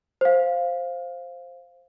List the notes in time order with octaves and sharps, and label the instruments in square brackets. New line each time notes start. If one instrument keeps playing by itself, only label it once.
[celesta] C5 F5